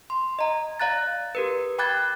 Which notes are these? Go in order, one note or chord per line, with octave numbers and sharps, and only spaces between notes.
C6
D#5 A#5
D5 F5 A#5 F#6 A6
G4 A#4 B4
G5 B5 D6 F#6 G#6 A6